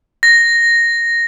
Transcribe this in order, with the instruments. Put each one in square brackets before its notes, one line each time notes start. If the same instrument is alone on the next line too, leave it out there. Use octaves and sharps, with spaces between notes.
[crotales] A#6